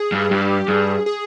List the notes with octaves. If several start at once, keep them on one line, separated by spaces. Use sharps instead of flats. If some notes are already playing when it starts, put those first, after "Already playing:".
Already playing: G#4
G2
G2 G4
G2 G#4
G#4